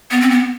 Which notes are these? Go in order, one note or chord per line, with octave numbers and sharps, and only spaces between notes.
B3
C4
B3